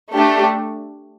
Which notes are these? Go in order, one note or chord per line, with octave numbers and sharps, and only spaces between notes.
A3 D4 G4